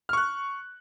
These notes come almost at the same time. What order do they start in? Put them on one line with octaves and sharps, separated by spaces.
F6 C#6 F#6